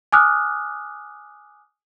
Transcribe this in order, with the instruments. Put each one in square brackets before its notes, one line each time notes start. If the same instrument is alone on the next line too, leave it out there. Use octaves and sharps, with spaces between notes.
[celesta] G#5 D6 D#6 F6 F#6